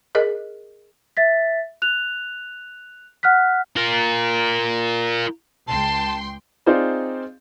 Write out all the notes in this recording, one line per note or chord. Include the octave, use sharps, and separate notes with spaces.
G#4 A#4 D#5
E5 A6 B6
F#6 F7
F#5 F6 F#6 B6
F4 A#4
C#2 G5 A5 C6
C4 D#4 F4 G#4 C5 D5